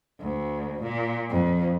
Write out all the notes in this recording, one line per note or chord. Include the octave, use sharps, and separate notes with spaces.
D2
A#2
F2